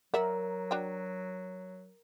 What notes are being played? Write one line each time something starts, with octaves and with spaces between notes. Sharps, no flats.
F#3 A#4 D5 E5 F#5
D4 F#4 G5